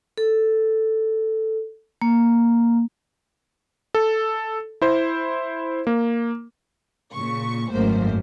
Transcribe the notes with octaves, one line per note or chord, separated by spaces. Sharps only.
A4
A#3
A4
E4 C5
A#3
A#2 C#3 C#6
G#1 F#2 A3 A#3 C5